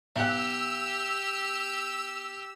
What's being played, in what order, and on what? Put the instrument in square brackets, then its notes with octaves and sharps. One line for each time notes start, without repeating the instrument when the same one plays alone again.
[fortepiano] B1 F#5 [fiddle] G4 [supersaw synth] E6